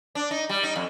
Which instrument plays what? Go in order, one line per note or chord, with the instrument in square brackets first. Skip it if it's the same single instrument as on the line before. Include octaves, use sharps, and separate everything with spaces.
[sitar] D4
D#4
G3
D#4
F2